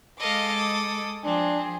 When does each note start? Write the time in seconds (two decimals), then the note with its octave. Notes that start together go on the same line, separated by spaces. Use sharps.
0.19 G#3 A4 D#5 F5 D6
0.57 D#6
1.24 F3 C4 D4 G#4